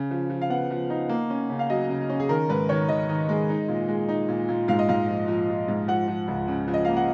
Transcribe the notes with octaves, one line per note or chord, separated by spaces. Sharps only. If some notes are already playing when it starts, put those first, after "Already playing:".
Already playing: C#3
F3
F3
F5
B3 F#5
F3
D#4
A#3
C#4
C#3
F5
F#3 D#5
C#3
C#4
G#4
D#3 A#4
G#2 B4
D#3 C#5
D#3 D#5
D#3
G#3
D#4
A#2
G#3
D#4
A#2
A#2
G#2 F5
D#5
G#2 F5
F3
F3
F3
G#2
F3 F#5
F3
C#2
C#3
F3
D#5
A#3 F5
F#5